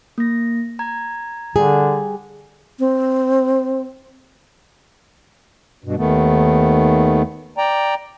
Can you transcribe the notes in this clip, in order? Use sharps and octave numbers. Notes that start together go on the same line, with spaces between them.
A#3 A#6
A#5 G#6
D3 G3 G#4
C4
G2 B2
D#2 D#3 A3 B3
D5 G5 A#5